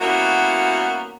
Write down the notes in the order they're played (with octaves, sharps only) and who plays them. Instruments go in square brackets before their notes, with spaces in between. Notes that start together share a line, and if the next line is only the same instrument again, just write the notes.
[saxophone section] G3 A#3 B3 C#4 E4 F#4